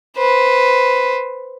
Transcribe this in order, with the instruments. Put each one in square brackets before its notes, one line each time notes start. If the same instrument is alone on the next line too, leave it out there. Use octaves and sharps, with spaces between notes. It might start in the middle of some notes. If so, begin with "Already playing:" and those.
[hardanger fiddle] B4 C5